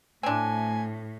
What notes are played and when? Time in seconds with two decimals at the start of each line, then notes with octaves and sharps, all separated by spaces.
0.23 A2 A3 C4 D4 G#5